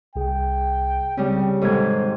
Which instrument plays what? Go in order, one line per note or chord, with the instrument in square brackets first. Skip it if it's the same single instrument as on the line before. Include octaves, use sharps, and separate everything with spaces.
[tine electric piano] C2 G#4 [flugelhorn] G5
[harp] C#3 G3 [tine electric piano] C4
[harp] G#2 C3 D#3 [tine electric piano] A4 G#6 [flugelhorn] C5